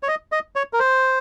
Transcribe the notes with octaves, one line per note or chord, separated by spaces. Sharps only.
C#5
D#5
D#5
C#5
A#4
C5